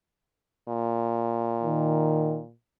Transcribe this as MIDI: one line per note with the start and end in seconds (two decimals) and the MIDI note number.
0.68 2.53 46
1.63 2.40 51